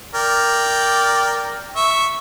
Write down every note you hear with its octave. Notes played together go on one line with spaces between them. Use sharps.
A#4 D5 G5
E5 C#6